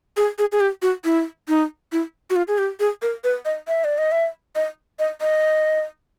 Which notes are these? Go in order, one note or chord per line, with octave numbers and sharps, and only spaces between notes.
G#4
G#4
G#4
G4
F#4
E4
D#4
E4
F#4
F4
G#4
G4
G#4
A#4
B4
D#5
E5
D5
D#5
E5
D#5
D#5
D#5